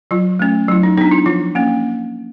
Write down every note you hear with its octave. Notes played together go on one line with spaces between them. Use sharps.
F#3 F4
A3 C#4
F#3 E4
D#4
B3 D4 D#4
E4
F3 F4
A#3 C#4